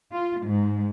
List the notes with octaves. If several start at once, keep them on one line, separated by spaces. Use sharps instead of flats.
F4
G#2